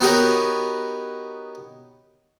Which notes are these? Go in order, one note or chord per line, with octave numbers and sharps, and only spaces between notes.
B3 D#4 F#4 G4 A#4 C#5